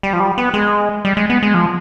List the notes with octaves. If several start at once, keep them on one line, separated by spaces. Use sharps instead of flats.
G3
F3
G3
B3
G#3
G3
G#3
B3
G#3
F3